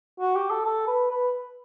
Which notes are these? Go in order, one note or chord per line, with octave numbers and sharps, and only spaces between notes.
F#4
G4
A4
A4
B4
B4